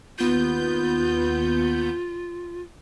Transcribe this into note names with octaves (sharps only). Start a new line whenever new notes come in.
D#2 B3 F4 G6